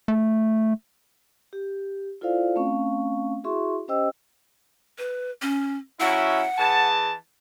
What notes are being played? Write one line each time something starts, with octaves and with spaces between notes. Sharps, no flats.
A3
G4
E4 F4 A4 C5 D5 F5
A3 C4 C#4 F5 C#6
E4 F#4 G#4 E5 C6 C#6
C#4 G4 C5 D#5 G5 E6
B4
C#4
F#3 C#4 E4 F#5
E3 G#4 A5